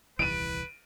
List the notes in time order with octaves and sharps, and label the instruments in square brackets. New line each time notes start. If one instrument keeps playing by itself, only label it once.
[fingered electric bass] D#1 C2 E3 [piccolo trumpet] B4 [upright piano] D7 D#7